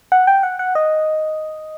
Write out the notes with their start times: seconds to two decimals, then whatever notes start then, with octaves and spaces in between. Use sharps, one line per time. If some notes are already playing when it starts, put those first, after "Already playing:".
0.12 F#5
0.27 G5
0.43 F#5
0.59 F#5
0.75 D#5